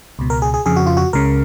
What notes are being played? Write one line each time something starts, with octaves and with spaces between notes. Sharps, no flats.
C#2 B2
A#4
G#4
G#4
F2 C#3 G#4
F#4
F4
F#4
C#2 C#3 A#4